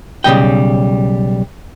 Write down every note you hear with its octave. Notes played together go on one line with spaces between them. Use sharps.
B1 C#3 G3 G#3 D#5 G5